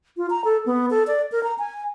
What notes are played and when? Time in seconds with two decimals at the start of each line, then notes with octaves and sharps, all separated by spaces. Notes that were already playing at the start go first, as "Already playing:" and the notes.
0.17 F4
0.30 A#5
0.45 A4
0.66 B3
0.90 A4
1.07 D5
1.32 A#4
1.43 A#5
1.59 G#5